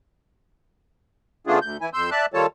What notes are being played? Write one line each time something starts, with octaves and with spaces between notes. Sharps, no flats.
C#3 A3 B3 D4 F4 G#4
D2 G6
E3 E4 G#5
F2 C6 E6 G6
D5 E5 A5 F#6
D#3 G3 F4 A4 C#5 A5